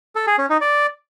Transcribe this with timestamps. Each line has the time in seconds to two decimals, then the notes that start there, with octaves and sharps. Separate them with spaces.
0.15 A4
0.27 G#4
0.38 C#4
0.50 D#4
0.61 D5